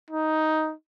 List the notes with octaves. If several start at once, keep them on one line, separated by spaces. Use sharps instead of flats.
D#4